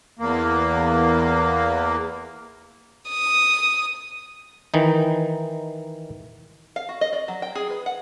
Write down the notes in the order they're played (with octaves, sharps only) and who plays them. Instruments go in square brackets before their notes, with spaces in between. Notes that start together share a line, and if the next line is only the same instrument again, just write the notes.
[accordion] E2 A#3
[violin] D#6
[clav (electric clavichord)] D#3 E3 D#4
[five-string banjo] F5
F#4
D#5
D5
F#3
G5
G#4
B4
F#5